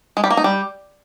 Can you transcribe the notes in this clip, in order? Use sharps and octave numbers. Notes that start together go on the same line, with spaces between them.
G#3
G3
A#3
D#4
G3